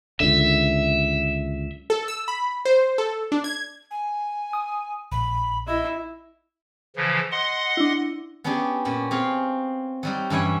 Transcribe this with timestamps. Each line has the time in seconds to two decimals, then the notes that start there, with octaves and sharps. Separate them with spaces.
0.20 C#2 F#2 D3 E5
1.90 A4
2.08 E6
2.28 B5
2.65 C5
2.98 A4
3.32 D4
3.44 G#6
3.91 G#5
4.53 D#6
5.12 A#1 B5
5.67 E4 D#5
6.96 C#3 E3 F3
7.31 D#5 F#5 C6
7.77 D4 E4
8.44 B3 C#4 D4 G4 G#4
8.85 A#2 C#4 B5
9.11 C4 G#4 C#5 F5
10.03 F#3 G3 D#4
10.30 G2 E3 C#4 E4 C#5 G#5